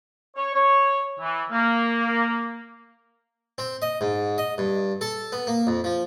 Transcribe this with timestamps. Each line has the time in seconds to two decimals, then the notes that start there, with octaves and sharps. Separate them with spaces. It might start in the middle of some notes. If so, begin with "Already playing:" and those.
0.36 C#5
0.53 C#5
1.19 E3
1.51 A#3
3.58 C4
3.82 D#5
4.01 G#2
4.38 D#5
4.58 G2
5.01 A4
5.32 B3
5.47 A#3
5.67 F2
5.84 F3